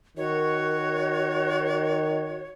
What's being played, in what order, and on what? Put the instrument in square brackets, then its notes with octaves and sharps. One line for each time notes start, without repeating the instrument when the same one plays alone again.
[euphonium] D#3 [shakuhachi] F#4 [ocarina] A#4 [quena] C#5